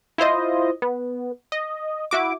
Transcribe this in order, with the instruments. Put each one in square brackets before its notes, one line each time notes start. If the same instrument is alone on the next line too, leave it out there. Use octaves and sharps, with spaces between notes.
[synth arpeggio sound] E4 F4 C5 D#5
B3
D#5
E4 F#4 D6